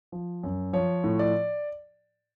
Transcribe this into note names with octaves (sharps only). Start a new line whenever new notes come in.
F3
F#2
F3 C#5
A2
D5